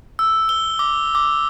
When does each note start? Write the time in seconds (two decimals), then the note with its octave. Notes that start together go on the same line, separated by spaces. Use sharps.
0.19 E6
0.49 G7
0.79 D6
1.15 D6